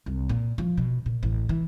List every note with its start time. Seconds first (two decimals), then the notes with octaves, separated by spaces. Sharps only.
0.06 C2
0.29 A#2
0.58 F3
0.78 B2
1.06 A#2
1.23 A1
1.49 E3